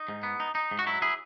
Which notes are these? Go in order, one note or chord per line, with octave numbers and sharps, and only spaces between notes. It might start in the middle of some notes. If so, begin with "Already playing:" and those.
Already playing: D#4
G#2
B3
D#4
D#4
G#2
F#4
F#3 E4
E4 G#4